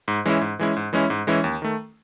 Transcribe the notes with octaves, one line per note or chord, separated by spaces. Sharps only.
G#2
E3 G#3 C#4 E4
G#2
E3 G#3 C#4 E4
G#2
E3 G#3 C#4 E4
G#2
E3 G#3 C#4 E4
D#2
D#3 A3